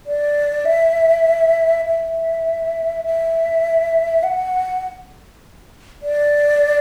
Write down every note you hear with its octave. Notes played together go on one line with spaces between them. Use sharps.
D5
E5
E5
E5
F#5
D5